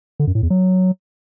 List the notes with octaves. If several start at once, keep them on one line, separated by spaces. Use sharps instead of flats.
D3
F#2
A2
E2
F#3